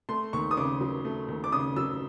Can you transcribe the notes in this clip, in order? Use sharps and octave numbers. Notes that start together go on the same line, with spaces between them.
A3 C6
D#2 C#6
D#6
C#3 D6
F#3
A3
D#2
D6
C#3 D#6
F#3 E6